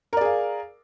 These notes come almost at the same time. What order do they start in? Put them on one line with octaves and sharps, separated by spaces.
A#4 D5 G#4 F5